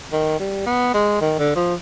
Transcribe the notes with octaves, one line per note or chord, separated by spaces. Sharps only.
D#3
G3
B3
G#3
D#3
D3
F3